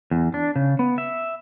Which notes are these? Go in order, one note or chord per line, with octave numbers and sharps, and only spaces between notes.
E2
D4
C#3
B3
E5